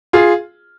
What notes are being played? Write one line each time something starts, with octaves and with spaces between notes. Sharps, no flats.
F4 G#4